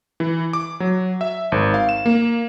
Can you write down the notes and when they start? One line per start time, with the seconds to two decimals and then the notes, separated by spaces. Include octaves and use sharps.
0.20 E3
0.53 D6
0.80 F#3
1.21 E5
1.52 G#1
1.74 F5
1.89 E7
2.06 A#3